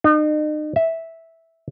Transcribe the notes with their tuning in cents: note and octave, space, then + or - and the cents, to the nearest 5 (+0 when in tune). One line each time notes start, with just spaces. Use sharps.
D#4 -40
E5 -10